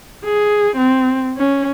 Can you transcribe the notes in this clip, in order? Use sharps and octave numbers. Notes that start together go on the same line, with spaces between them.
G#4
C4
C#4